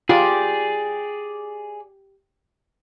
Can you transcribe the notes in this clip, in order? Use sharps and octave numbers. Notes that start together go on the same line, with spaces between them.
F4 G4 G#4 D5